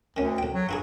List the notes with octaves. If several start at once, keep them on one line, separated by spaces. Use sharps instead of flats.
D2 D#3 C#4
B1 G5
F#3
G2 F4 F#4 G#4